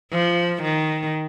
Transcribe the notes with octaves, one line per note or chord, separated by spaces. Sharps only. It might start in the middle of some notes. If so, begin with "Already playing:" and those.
F3
D#3